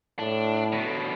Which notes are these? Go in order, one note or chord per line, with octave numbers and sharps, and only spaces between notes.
A2 D4
B2 D3